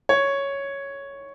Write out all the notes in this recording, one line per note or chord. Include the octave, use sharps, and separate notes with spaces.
C#5